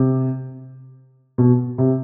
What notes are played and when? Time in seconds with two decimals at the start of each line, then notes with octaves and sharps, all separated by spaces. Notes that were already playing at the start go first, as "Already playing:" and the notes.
Already playing: C3
1.38 B2
1.78 C3